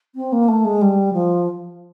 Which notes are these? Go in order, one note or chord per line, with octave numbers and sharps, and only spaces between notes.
C4
A#3
A3
G#3
G3
F3